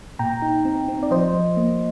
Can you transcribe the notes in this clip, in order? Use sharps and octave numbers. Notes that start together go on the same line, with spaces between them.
A#2 G5 A#5
D#4
C4
C4
D5
F3 C5 D#5
F3
A#3